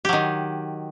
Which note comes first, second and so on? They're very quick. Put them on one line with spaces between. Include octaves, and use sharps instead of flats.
G4 F#3 D#3